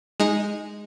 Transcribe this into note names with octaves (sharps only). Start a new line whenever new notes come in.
G#3 D#4